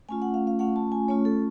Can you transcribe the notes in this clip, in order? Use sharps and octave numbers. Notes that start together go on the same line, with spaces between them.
A3 C#4 F4 G#5
F#5
F5
F5
A3 C#4 F4 F#5
A5
G#5
A3 C#4 F4 C#5
A4